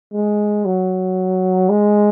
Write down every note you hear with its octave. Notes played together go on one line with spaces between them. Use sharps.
G#3
F#3
G#3